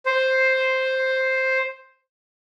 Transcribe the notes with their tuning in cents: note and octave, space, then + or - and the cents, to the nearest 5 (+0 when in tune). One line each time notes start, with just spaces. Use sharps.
C5 +5